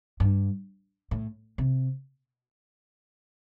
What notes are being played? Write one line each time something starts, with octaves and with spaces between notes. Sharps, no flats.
G2
A2
C3